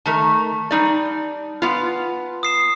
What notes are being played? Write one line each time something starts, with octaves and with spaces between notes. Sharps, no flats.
D#3 A3 A#4 A5
G3 D#4 D5
B3 F4
D#6 C7 E7